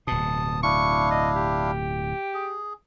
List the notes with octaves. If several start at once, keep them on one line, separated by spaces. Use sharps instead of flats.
D1 B2 A5 D#6
D4 E4 F5 C#6
D#5
G4
G#4